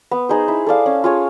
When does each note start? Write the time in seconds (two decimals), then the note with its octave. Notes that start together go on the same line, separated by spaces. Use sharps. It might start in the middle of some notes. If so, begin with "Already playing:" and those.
0.11 B3
0.29 D#4 G#4 C5
0.48 E4
0.67 A4 D5 F5
0.86 C#4
1.04 F4 G#4 C#5